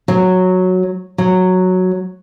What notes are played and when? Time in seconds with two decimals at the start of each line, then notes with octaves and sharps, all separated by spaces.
0.08 F#3
1.18 F#3